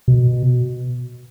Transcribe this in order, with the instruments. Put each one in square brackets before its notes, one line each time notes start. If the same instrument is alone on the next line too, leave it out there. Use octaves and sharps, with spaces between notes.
[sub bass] B2